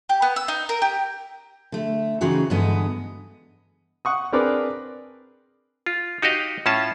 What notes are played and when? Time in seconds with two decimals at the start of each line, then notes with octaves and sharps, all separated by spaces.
0.09 G4
0.22 B3
0.36 E6
0.48 D#4
0.69 A#4
0.82 G4
1.72 D3 A3
2.21 C#3 E3 C4 D#4 F#4 G#4
2.50 G2 D3 E3 G#3 B3 D#5
4.05 F#5 C#6 D#6
4.32 C4 D4 G#4 A#4 B4 D5
5.86 F4
6.22 D#4 F#4 G4 D#5 F5
6.66 A2 C#4 F4 A5